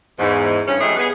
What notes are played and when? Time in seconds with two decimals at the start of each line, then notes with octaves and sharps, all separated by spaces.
0.19 E2 G#2
0.67 G2 C#4
0.81 F3 G3 A3 D#4 F#4 G#4
0.97 B3 G#4